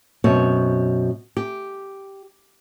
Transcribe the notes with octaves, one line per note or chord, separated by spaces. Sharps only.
F#2 B2 C4 C#5
G4